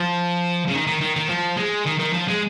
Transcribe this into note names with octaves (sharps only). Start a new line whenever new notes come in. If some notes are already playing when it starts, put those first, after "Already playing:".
Already playing: F3
C#3
D#3
D#3
D#3
D#3
F3
G#3
D#3
D#3
F3
G#3